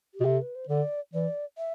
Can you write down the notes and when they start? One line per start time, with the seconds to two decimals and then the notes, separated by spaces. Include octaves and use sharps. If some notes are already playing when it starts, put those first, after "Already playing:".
0.14 G4
0.20 B2
0.25 C3 A4
0.42 B4
0.55 C5
0.69 D3 D5
1.14 E3 D5
1.58 E5